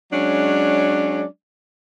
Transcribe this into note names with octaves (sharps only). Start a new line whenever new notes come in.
F#3 G#3 C#4 D4 D5